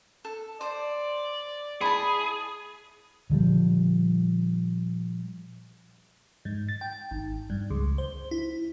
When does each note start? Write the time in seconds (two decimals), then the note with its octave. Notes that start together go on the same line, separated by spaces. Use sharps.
0.25 A4
0.61 C5 D5
1.81 E4 G#4 A5 B5
3.30 A#2 D3 F3 G3
6.45 G#2
6.69 A6
6.81 G5
7.11 G#1
7.50 G2
7.71 C#2
7.98 C5
8.31 E4